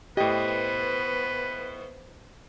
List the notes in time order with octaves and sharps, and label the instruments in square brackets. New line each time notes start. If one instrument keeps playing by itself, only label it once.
[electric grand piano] A2 D#5 [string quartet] B3 C5 [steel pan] G4 [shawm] B4